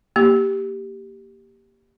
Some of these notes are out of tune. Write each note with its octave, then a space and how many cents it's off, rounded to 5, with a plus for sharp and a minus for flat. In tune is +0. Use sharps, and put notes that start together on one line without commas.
A#3 +0 G4 +0